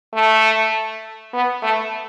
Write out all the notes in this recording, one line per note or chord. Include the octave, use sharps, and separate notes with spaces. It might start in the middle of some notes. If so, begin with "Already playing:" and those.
A3
B3
A3